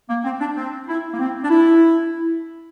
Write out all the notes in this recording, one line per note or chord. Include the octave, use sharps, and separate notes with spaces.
A#3
C4
D4
C4
E4
A#3
C4
D4
E4